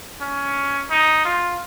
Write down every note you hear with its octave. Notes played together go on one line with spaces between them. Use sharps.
C#4
D#4
F4